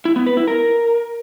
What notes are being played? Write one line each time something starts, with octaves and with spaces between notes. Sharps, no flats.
E4
B3
B4
E4
A#4